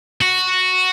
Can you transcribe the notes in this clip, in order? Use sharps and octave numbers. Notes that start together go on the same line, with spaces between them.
F#4